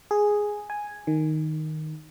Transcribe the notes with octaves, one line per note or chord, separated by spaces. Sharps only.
G#4
G#5
D#3